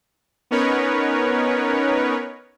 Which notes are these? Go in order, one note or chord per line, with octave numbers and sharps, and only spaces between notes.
B3 C#4 D#4 A#4 B4 C#5